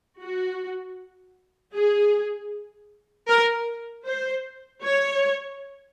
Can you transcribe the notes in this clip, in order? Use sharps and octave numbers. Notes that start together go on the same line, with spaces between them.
F#4
G#4
A#4
C5
C#5